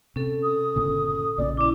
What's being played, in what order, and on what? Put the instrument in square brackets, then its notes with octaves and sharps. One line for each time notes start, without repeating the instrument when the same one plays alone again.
[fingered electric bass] C3 [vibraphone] C#4 A4
[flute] D#6
[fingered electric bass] G1 A#2 C#3
[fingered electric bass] A#1 A#2 C#3 [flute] D5
[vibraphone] C#4 E4 [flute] D6